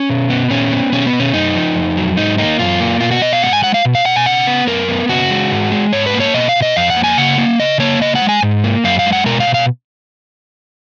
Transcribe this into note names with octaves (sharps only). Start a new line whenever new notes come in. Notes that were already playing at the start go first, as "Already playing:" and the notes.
Already playing: C#4
B2
B3
A#2 C#4
B3
B2 C#4
B3
B2
C#4
F#2 D#4
F3
F2
F#3
G#2 D#4
A#3 D#4
F#2 F4
A#3
B2 F4
F#4
B2 D#5
F5
G#2 F#5
G#5
G#3 F#5
F5
B2
F5
B2 F#5
G#5
C#3 F#5
B3
F#2 A#4
B3
C#3 F#4
G#3
G#2
G#3
G#2 C#5
B4
A#3
C#5
B2 D#5
F5
B2
D#5
F2 F5
F#5
A#3
G#5
C#3 F#5
A#3
C#3 D#5
A#3 C#5
C#3 D#5
F#5
G#3
G#5
G#2
A#3
F#2 F5
F5
G#3
F#5
B2 A#4
F5
B2
F5